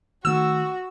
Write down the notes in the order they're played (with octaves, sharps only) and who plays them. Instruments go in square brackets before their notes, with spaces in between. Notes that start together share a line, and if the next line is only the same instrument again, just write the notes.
[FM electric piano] D#3 A3 [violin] F#4 [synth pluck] E6